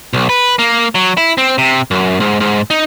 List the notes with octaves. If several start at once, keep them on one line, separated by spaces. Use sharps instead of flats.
B1
B4
A#3
F#3
E4
C4
C3
F#2
G#2
G#2
D#4